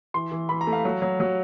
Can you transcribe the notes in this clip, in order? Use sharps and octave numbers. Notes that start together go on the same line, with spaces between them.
E3 C6
E3
E3 B5
A#5
A3
F5
F#3
F#3
F#3